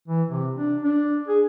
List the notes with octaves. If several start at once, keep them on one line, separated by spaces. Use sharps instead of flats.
E3
C3
D4
D4
G#4